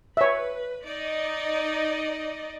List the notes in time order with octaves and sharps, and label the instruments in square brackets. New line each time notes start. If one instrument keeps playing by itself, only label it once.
[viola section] B4 [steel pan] C#5 E5
[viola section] D#4 D5 D#5